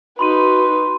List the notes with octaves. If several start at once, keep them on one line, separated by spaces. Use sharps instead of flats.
D#4 F#4 B4 B5 C6 D#7